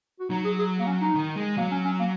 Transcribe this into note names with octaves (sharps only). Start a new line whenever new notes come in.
F#4
F#3 D#4
G#4
G#4
A#3
C#4
D#4
D#3
G#3
F#3 A#3
C#4
C#4
A#3